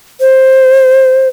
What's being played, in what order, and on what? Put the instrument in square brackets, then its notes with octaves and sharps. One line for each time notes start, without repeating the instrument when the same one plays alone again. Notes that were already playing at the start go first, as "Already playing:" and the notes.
[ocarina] C5